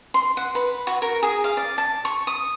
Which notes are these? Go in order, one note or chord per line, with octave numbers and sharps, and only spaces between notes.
C6
F#5
B4
F#4
A#4
G#4
F5
D5
A5
C#6
D#6